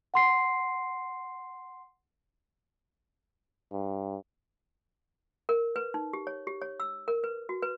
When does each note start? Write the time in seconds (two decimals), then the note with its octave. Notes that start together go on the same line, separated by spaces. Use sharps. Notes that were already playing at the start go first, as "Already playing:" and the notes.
0.14 F#5 C6 C7
3.72 G2
5.49 A#4
5.76 B4
5.94 D#4
6.13 G4
6.27 C#5
6.47 G4
6.61 C#5
6.80 E6
7.08 A#4
7.24 B4
7.49 F#4
7.62 B4